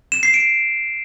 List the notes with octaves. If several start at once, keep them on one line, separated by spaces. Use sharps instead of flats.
E7
C7
D7